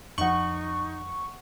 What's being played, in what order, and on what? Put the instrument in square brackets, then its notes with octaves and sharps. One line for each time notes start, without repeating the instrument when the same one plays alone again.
[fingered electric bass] F2 F3 [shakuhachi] D#4 [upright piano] F#5 F#7 [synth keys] C#6